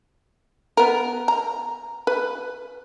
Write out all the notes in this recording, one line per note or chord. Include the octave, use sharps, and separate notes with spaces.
B3 A#4
A#5
B4